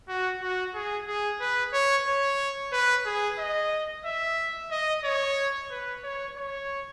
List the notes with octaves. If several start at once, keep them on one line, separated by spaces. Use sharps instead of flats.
F#4
F#4
G#4
G#4
B4
C#5
C#5
B4
G#4
D#5
E5
D#5
C#5
B4
C#5
C#5